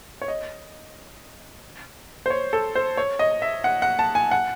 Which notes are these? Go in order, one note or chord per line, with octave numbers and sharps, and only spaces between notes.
C#5
D#5
C5
C#5
A4
C5
C#5
D#5
E5
F#5
F#5
A5
G#5
F#5